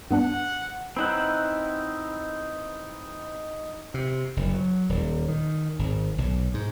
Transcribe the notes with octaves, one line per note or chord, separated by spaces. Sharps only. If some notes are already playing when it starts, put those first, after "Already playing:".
G2 B3 D4 F#5
C4 D#4 E4 B4 F#5
C3
F#1
F#3
D#1
D#3
G#1
B1
G#2